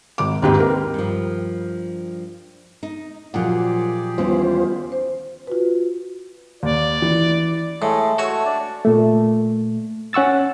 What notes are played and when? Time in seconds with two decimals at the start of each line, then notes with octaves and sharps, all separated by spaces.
0.18 G#1 D6
0.42 D#2 G#2 D#3 C4 G4 B4
0.60 A#4
0.94 G2 F3
2.83 D#4
3.34 A#2 F3 F#3 F4 G4 G#4 D5 F#5
4.18 D#2 E3 G3 B3 C#4 F4 C5
4.92 C5
5.47 F4 F#4 B4
6.63 D#2 D5
7.02 E3
7.82 A2 G#3 A3
8.18 A3 F#4 C#5
8.46 D4 D5
8.85 A#2 A3
10.13 C#4 F#5 C#6 E6 A6